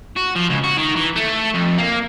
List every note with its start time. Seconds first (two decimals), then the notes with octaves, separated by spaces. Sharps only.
0.16 F#4
0.35 F3
0.49 C#2
0.63 F#4
0.77 D#3
0.96 E3
1.16 A3
1.54 F2
1.78 A#3